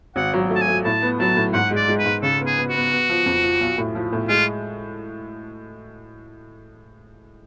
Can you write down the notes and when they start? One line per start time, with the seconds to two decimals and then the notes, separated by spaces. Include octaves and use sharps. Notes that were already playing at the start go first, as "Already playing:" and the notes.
0.16 G#1 F#5
0.34 F#3
0.50 A3
0.56 A5
0.62 G#5
0.68 A3
0.85 A2 A5
1.02 B3
1.19 F#3 A5
1.37 A2
1.53 G#2 F#5
1.71 G#3
1.76 D5
1.88 G#3
1.99 B4
2.05 G#2
2.23 C#3 A4
2.40 B3
2.46 G#4
2.57 B3
2.68 F#4
2.74 B3
2.91 B3
3.09 F3
3.26 F2
3.43 F3
3.61 B1
3.78 A2
3.95 F3
4.13 A2
4.29 G#3 F4